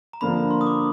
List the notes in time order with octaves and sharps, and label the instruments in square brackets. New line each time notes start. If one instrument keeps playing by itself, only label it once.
[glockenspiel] A#5
[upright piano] D3 F3 A#3 D4 [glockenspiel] B5
[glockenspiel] C6
D#6
D6